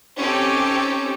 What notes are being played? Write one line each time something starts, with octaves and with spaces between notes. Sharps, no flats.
C4 C#4 D#4 G4 A4